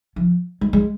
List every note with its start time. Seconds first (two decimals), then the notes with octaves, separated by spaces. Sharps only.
0.16 F3
0.61 G#3
0.73 G#3